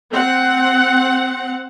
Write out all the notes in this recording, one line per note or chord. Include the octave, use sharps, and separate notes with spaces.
C4 F#5